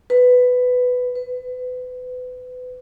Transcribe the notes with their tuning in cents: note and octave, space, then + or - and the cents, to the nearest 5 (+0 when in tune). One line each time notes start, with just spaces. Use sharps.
B4 +10
B4 +30